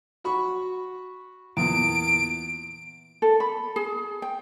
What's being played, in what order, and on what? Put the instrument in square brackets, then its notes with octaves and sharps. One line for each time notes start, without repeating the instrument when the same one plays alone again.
[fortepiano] F#4 B5 C#6
[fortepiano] E2 A#2 [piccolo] D7
[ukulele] A4
B5
G#4
G5